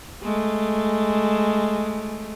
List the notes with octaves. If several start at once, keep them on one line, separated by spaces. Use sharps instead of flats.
G#3 A3